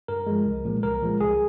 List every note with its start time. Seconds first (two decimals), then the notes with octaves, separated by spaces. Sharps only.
0.08 G2 A#4
0.27 F3 G#3
0.46 C2
0.65 A#2 F3 G#3
0.83 C2 A#4
1.02 A#2 F3 G#3
1.20 C2 G#4